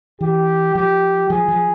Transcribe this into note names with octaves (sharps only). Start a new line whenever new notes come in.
E3 G4
F3 G4
F3 G#4
F3